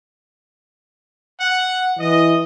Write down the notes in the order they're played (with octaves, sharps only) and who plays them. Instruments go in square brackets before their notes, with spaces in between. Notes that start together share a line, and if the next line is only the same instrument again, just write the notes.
[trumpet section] F#5
[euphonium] E3 [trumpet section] D#5